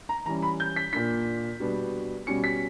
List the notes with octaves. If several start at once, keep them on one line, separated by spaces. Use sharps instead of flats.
A#5
E3 G3 C#4 A#5
B5
G6
B6
A#2 A#3 D4 B6
B2 G3 B3 D4
B2 G3 C#4 C#7
B6